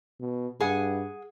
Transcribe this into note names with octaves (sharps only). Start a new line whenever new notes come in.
B2
G2 G#4 F#5